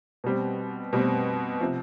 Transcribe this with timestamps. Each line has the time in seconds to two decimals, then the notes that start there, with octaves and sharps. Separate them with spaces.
0.24 B2 G3 C4
0.93 B2 G3 C4
1.61 C3 F3